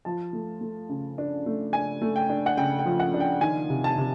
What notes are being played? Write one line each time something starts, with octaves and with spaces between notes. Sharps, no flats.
F3 A5
A3
A3
C#3
D4
A3
D4 G#5
A3
G5
D4
F#5
C#3 G5
G5
F3
F#5
D4
G5
D#3 G#5
C3
A5
C3